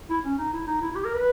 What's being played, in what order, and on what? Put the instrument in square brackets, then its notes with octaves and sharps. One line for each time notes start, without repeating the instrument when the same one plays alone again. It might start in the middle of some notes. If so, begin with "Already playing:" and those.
[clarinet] E4
C#4
D#4
E4
D#4
E4
E4
G4
A#4
B4